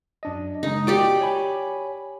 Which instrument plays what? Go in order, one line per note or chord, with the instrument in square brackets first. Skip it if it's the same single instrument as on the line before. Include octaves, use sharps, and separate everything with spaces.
[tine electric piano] F#2 D4 D#5
[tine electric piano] C#3 G#3 [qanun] D#4
[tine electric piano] F#4 [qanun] G4 D5 G5
[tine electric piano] C#5 G#5 B5